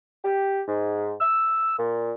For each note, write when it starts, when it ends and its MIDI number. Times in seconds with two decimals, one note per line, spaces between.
0.24 0.62 67
0.67 1.14 44
1.21 1.72 88
1.78 2.13 46